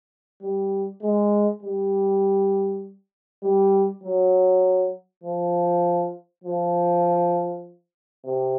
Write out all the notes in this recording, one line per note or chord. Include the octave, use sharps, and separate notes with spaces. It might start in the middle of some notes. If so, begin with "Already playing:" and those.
G3
G#3
G3
G3
F#3
F3
F3
C3